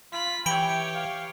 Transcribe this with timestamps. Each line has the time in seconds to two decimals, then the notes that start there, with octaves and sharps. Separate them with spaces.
0.13 F4 B5 B6
0.46 E3 G4 C#5 G5 B5 D7 G7
0.95 F5